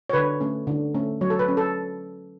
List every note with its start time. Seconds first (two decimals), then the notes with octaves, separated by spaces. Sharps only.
0.10 C#5
0.13 D3 B4
0.41 A3 C#4
0.67 D3
0.95 A3 C#4
1.21 F#3 C#5
1.30 A4
1.39 B4
1.48 C#4
1.57 A4